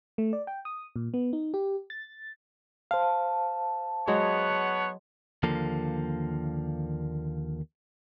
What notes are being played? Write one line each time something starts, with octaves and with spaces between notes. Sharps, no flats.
A3
D5
G5
D#6
A#2
B3
D#4
G4
A6
C5 F5 A5
F#3 G#3 B3 G#4 C#5 F#5
D#2 D3 F3 A#3 A4